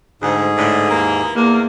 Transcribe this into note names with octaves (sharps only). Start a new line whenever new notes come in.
D2 G#2 G#4
A2 D3
D#2 E3 A#3
E2 A#3